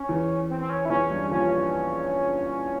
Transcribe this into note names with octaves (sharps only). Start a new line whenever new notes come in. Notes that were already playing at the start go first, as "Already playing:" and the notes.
Already playing: C#4
E2 E3
C4
C4
C#4
E4
E2 E3 C#4
G2 G3
A#1 A#2 C#4